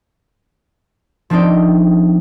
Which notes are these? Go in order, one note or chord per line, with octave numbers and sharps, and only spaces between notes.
F3 C4 D4 D#4 G5